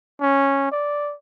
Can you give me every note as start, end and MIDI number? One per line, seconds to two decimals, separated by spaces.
0.22 0.68 61
0.72 1.14 74